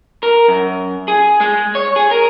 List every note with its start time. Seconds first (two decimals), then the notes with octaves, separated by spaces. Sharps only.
0.23 A#4
0.48 F#2
1.08 G#4
1.41 G#3
1.75 C#5
1.96 G#4
2.11 A#4